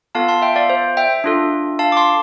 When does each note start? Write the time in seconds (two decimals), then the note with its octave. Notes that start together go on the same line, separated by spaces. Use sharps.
0.15 B3 F4 A4 F5 A5
0.28 A5 C6
0.42 E5 G5
0.56 D5 F5
0.70 C5
0.97 E5 G5
1.24 D4 F4 A4
1.79 F5 A5
1.92 D6
1.97 A5 C6